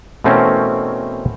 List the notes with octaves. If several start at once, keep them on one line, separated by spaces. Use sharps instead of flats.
B2 E3 A3 C4 C#4 A#4